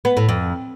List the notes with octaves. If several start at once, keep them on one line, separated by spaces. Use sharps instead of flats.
B3
A2
F2